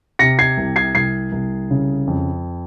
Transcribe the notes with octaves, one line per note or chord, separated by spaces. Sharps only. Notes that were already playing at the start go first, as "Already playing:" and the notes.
C3 A#6 C#7
G#6 C7
C2
G#6 C7
C2 G#6 C7
C2
C#3
F2